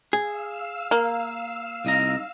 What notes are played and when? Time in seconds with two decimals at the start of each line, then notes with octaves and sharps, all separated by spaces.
0.13 G#4 F5 E6
0.91 A#3
1.85 C2 D#4 A#5